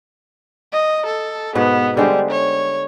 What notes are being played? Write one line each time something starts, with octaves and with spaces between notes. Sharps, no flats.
D#5
A4
G#2 B2 B3 B4
D3 G3 G#3 C5
C#5